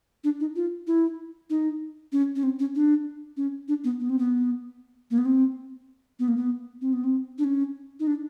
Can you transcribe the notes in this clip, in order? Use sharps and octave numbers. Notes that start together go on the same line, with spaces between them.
D4
D#4
F4
E4
D#4
C#4
C#4
C4
C#4
D4
C#4
D4
B3
B3
C4
B3
A#3
B3
C4
B3
A#3
B3
C4
B3
C4
D4
C#4
D#4
D4